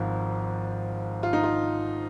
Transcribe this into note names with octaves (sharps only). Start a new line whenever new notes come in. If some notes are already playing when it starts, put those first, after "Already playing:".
Already playing: G#1 G#2 F3
F4
D#4
F4